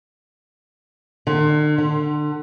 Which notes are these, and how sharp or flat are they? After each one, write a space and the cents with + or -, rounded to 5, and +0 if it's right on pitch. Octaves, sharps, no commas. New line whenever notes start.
D3 +45
D3 +30